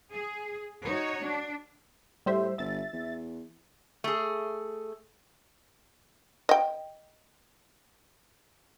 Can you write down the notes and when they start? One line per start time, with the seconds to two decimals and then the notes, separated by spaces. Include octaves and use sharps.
0.14 G#4
0.84 D#4 F#4 C#5
1.23 D4
2.26 A2 G3 C5 E5
2.58 G1 E5 A6
2.93 E2
4.04 A3 G#4
6.49 D#5 G5